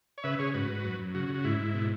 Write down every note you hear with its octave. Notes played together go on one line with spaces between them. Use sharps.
C#5
C#3 B4 E5
C#3 G#4 C#5
G#2 F#4 B4
G#2
F#2
F#2
C#3 F#4
C#3
F#4
G#2 E4
G#2
B2